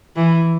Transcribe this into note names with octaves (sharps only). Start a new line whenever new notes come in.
E3